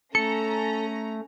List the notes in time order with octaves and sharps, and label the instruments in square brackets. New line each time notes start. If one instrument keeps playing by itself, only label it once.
[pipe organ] A3 [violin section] C#4 A#5 [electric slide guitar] A4 [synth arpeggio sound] C#7